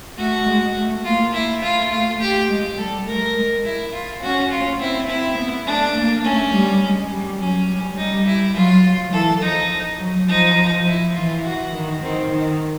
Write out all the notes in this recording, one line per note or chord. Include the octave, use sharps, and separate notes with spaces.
A3 F#4
G#3
A3
A#3 F4
E4
A3 F4
F4
G4
G#3
G3 A4
A3 A#4
G#3
E4
F4
C#4 F#4
F4
C4 E4
C4 E4
B3
A3 D4
A#3
A3 C#4
G3
G#3
G3
F#3 C#4
G3
G3 D#4
E4
F#3 F4
F#3
E3 A4
F3 D#4
F#3
F3 D#4
E4
E3 F4
F#4
D#3
D#3 C4
D#3